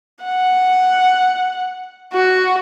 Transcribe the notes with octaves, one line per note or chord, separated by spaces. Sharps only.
F#5
F#4